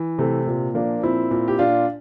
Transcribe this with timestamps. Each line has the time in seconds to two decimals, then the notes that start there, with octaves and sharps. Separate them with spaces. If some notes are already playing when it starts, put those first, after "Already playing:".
Already playing: E3
0.19 C3 A3
0.47 A#2
0.74 F3 A#3 D4
1.03 A#2 C4 E4
1.31 A#2
1.48 G4
1.59 A#2 D4 F4